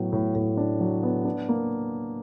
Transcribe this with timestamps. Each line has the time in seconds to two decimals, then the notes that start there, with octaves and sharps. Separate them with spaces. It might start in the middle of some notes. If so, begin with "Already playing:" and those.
Already playing: A2 F#3 B3
0.12 A2
0.35 A2
0.57 D4
0.80 F#3
1.03 B3
1.25 D4
1.49 A#3